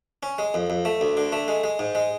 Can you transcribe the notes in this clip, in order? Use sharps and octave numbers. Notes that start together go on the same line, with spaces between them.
C#4
G#3
F2
F2
A3
D2
D3
A3
G#3
G#3
G#2
G#3